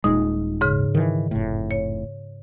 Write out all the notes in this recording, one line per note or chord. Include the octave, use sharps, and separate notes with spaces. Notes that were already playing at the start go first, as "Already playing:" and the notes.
D#1 A#2 G#3 D#4
G#2 C#3 F6
D#3 E3
F1 A2
C#5